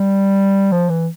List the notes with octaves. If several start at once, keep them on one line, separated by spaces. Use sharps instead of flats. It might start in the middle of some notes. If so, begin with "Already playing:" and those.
Already playing: G3
F3
E3